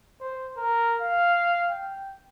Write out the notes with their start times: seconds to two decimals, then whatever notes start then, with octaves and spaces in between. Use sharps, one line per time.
0.20 C5
0.57 A#4
1.01 F5
1.70 G5